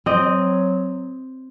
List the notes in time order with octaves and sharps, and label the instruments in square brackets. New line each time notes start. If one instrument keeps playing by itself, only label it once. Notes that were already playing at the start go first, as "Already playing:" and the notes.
[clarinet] F#3 [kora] C4 D#5